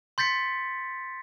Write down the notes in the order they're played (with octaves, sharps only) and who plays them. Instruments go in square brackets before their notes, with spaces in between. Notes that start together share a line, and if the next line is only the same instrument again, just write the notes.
[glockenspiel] C6 G6 A6 B6 C#7